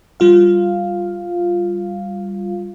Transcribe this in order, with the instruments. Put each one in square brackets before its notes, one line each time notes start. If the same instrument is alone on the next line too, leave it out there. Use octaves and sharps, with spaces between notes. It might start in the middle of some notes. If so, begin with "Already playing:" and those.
[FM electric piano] G3 F4 F5